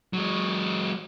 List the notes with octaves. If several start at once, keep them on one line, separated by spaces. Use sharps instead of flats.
F#3 G#3